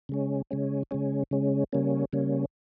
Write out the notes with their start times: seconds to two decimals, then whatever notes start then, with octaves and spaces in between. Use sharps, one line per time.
0.09 C#3 G#3 C#4
0.51 C#3 G#3 C#4
0.91 C#3 G#3 C#4
1.31 C#3 G#3 C#4
1.72 C#3 G3 A#3 C#4
2.13 C#3 G3 A#3 C#4